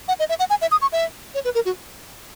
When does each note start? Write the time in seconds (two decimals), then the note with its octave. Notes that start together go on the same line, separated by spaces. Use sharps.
0.08 F#5
0.20 D#5
0.29 E5
0.39 F#5
0.50 G#5
0.62 E5
0.71 D#6
0.82 C#6
0.92 E5
1.34 C#5
1.45 B4
1.55 A#4
1.65 F#4